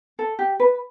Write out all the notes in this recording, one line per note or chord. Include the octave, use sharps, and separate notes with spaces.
A4
G4
B4